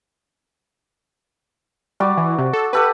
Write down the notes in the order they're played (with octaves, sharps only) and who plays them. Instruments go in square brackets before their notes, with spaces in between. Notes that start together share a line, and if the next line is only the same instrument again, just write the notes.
[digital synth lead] G3 [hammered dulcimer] F#4 D5
[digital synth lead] E3
C3
A4
[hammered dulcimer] G4 A4 F#5 [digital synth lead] B4